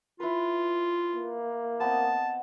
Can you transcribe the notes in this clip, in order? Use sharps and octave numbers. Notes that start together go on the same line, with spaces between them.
E4 F4 B4
A#3
B3 C4 D#5 A5